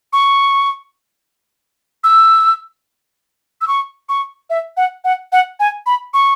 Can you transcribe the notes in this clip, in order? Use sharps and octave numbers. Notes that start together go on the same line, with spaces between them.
C#6
E6
E6
C#6
C#6
E5
F#5
F#5
F#5
G#5
B5
C#6